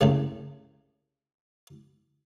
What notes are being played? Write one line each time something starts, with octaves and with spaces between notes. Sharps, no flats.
C2 A2 C#3 A3